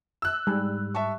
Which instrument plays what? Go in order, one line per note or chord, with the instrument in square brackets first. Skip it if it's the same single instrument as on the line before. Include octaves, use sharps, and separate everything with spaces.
[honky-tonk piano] E6 F#6
[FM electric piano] G#2 [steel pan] G3
[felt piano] E5 A5 C#6